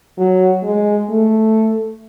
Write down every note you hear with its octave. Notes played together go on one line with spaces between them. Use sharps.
F#3
G#3
A3